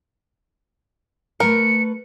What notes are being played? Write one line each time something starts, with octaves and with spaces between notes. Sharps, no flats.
A3 A#4 B4 C#7